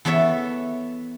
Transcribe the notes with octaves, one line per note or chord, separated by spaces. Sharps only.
E3 B3 A4 C#5 E5